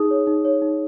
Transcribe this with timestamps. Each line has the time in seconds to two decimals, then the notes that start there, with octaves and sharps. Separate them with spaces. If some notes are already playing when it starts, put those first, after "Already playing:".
Already playing: D#4 G#4 D#6
0.11 C#5
0.27 D#4
0.45 C#5
0.62 D#4